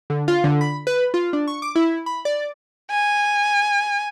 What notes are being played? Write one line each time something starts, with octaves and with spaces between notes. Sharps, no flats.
D3
F4
D3
B5
B4
F4
D4
C#6
D6
E4
B5
D5
G#5